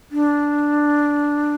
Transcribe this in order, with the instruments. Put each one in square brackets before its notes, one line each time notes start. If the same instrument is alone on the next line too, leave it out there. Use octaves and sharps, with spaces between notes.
[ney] D4